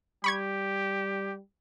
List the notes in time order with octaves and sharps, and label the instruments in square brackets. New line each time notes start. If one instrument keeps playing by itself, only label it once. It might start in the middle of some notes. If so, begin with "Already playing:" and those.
[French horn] G3 [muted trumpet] G4 [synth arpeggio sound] B5 C#6 G#6